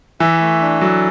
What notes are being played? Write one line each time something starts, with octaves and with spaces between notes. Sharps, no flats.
E3 E5
A3
D4
F#3 A4